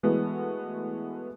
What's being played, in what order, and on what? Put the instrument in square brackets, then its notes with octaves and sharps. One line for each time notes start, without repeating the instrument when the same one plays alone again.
[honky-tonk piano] E3 G#3 A3 B3 F#4